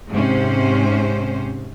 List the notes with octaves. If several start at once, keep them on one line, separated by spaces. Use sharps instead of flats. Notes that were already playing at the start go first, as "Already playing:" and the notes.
G#2 C3 C#4 C5